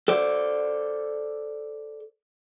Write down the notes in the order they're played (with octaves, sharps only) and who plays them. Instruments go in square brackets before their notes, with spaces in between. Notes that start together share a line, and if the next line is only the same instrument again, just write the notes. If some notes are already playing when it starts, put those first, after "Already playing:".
[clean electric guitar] A4 C5 D5